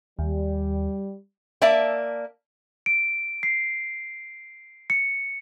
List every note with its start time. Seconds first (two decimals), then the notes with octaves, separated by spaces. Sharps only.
0.19 D#2 G3
1.62 A#3 D5 E5 A5
2.86 D7
3.43 C7
4.90 C#7